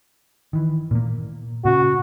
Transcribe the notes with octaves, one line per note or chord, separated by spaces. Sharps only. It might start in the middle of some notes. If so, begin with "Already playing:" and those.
D#3 E3
A#2 A#3
A#2 C#3 F#4